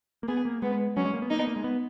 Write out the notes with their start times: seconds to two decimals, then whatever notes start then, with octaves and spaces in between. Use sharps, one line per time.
0.23 A#3
0.28 B3 G#4
0.45 A#3
0.62 G#3 B3
0.97 F#3 C#4
1.05 G#3
1.13 A#3
1.22 B3
1.30 A#3 D#4
1.39 B3
1.47 A#3
1.56 G#3
1.64 B3